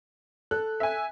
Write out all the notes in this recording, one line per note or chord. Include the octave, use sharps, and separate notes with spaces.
A4 F#6
E5 G#5